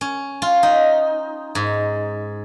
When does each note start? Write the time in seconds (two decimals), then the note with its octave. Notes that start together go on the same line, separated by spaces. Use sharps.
0.01 C#4
0.42 F4
0.63 D#4
1.55 G#2